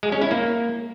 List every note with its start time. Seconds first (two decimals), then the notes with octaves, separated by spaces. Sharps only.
0.03 G#3
0.12 C#4
0.22 E4
0.31 A#3